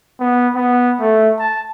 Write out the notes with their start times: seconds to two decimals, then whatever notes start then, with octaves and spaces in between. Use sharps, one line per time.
0.20 B3
0.56 B3
1.00 A3
1.39 A5